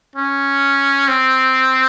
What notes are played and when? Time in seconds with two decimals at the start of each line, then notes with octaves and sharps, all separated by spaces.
0.16 C#4
1.08 C4